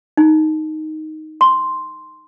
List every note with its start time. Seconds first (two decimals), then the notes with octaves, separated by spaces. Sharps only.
0.17 D#4
1.41 C6